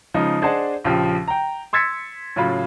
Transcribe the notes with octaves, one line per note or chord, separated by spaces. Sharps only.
C#3 F3 G#3 D#4
D4 G#4 C5 D#5 F#5 A5
A#1 C#3 F3 G4
G5 A#5
C6 E6 G#6 A6 B6 C#7
A2 C#3 F#3 F4 B5